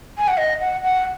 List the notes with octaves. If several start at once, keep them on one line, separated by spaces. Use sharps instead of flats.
G#5
F#5
D#5
F#5
F#5